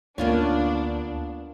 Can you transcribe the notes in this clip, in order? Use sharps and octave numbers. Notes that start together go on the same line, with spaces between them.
D2 A#3 B3 C#4 D4 F4 C#5